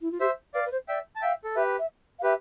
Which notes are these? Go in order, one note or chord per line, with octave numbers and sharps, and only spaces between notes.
E4
F4
G4 C5 E5
B4 D5 F5
B4
C5
D5 E5 G5
A5
E5 F5 G5
A4
G4 B4 E5
E5
F5
G4 B4 E5